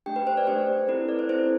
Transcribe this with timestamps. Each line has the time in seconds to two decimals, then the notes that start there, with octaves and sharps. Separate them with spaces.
0.06 A3 D4 G4 G5
0.16 B4
0.27 C5
0.37 D5
0.47 A3 D4 G4 C5
0.88 C4 E4 A4 B4
1.09 D5
1.19 C5
1.29 C4 E4 A4 C5